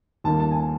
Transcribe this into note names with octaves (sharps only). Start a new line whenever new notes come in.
D#2 D#3 G3 A#3 A5
A5
G#5
A5